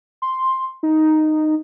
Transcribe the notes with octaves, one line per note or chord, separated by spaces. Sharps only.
C6
D#4